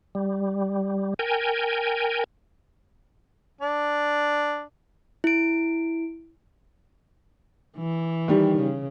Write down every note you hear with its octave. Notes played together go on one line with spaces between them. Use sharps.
G3
A#4 G5 G#5
D4
E4 D7
E3
D#3 G3
C#3